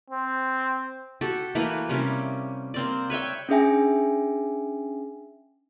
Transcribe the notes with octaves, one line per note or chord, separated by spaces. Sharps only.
C4
F#4 G4 A4
E3 A3 A#3 B4
C3 G3 A#3 C#4
A#3 C4 D5
B4 C#5 E5 G5
C#4 D4 G#4 E5 G5 G#5